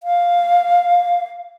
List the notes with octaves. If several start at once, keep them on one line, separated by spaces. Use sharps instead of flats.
F5